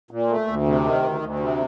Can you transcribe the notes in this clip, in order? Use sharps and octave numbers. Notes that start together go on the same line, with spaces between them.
A#2
A3
D2
C3
D#3
D2
D2
C3